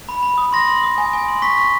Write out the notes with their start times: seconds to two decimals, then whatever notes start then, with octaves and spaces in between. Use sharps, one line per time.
0.09 B5
0.23 B5
0.38 D#6
0.53 C6 A#6
0.68 C6
0.83 D#6
0.98 G#5
1.13 G#5
1.28 C6
1.42 C#6 B6
1.57 C#6